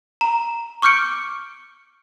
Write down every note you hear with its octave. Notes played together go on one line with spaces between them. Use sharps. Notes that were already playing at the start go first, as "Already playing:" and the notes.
A#5
C#6 D6 F6 G6 C#7 D7